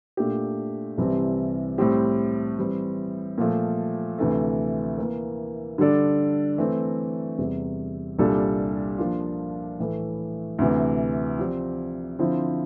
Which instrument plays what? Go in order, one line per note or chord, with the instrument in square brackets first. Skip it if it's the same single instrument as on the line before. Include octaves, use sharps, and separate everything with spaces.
[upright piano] A#2 A3 D4 G4
C2 C3 E3 G3 C4
A2 G3 C4 G4
E3 G3 C4
A#2 F3 A3
D2 C3 E3 A3
E3 A#3 E4 A#4
D3 G3 D4 A4 D5
E3 A3 C4
E2 C3 G3
C2 A#2 G3 D4 A4
F3 A#3 D4 F4
A2 E3 A3
D2 C3 E3
F3 C4 G4 D5
D3 F3 C4 E4